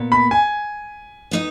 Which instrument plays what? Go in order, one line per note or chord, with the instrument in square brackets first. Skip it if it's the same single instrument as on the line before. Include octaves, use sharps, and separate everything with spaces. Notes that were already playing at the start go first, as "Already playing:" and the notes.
Already playing: [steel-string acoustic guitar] A#2 B3
[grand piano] B5
G#5
[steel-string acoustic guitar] B3 D#4 A#4 D#5